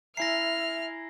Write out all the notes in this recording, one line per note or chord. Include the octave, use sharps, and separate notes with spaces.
E4 E5 G#5 A#5 F6 A#6 C7